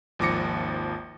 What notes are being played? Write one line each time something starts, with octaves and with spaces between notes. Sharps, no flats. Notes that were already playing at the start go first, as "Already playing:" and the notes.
G#1 D#2 F3 D6 A#6 C#7